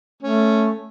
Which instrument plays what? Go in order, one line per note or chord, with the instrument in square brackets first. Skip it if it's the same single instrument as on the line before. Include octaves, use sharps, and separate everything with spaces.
[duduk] A3 [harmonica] C#4